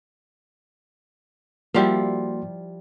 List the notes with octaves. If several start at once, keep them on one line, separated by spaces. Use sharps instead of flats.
F3 G3 A#3 E4 F#4 C6